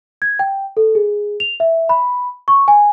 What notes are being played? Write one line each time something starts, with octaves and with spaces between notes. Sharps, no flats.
G#6
G5
A4
G#4
F7
E5
B5
C#6
G#5